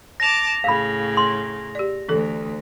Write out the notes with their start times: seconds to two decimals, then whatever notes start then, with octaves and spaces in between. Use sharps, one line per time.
0.20 A5 D6 A#6 F7
0.64 A2 C#3 F5 B5
1.17 C6
1.75 G4 D5
2.09 D2 E3 A4